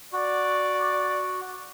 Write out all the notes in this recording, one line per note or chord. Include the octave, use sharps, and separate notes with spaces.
F#4 D5